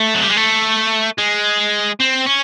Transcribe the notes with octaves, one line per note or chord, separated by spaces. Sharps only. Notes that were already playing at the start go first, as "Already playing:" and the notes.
Already playing: A3
F#3
G3
G#3
A3
G#3
C4
C#4